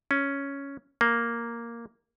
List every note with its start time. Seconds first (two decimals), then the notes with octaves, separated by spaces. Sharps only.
0.11 C#4
1.01 A#3